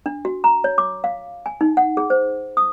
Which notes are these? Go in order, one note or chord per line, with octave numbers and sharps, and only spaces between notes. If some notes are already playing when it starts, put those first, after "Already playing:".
D4
F#4
A#5
C#5
D6
F5
G#5
D#4
F#5
G#4
C5
D#6